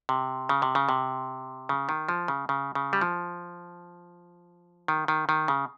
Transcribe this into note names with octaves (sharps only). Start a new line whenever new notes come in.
C3
C#3
C3
C#3
C3
C#3
D#3
F3
C#3
C#3
C#3
G3
F3
D#3
D#3
D#3
C#3